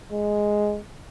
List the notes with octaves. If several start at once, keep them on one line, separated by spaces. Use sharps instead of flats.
G#3